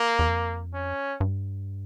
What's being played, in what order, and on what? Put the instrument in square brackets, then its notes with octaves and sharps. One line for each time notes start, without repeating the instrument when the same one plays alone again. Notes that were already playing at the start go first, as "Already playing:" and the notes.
Already playing: [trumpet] A#3
[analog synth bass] E2
F2
[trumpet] C#4
[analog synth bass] G2